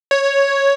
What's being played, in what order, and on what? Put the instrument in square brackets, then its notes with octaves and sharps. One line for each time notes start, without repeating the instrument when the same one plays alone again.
[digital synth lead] C#5